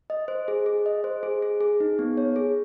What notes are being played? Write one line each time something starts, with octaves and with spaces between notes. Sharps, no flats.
D#5
C5
G#4
G#4
D#5
C5
G#4
G#4
G#4
D#4
B3
C#5
G#4